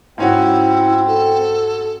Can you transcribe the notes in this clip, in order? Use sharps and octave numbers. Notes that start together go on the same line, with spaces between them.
G#2 C4 C#4 E4 F#4
A4